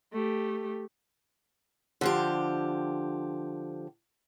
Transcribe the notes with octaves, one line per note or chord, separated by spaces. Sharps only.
A3 G4
D3 F3 G4